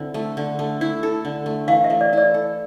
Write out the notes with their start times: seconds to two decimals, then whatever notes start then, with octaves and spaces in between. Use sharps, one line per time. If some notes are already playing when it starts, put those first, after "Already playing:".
Already playing: D3 C4 E4
0.14 A3
0.37 D3
0.59 A3
0.81 E4
1.03 A4
1.25 D3
1.46 A3
1.68 E3 F5
1.84 E5
1.90 A3
2.01 D5
2.13 E4 D5
2.34 A4